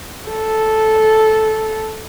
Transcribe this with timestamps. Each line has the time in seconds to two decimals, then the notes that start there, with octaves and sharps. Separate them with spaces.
0.30 A4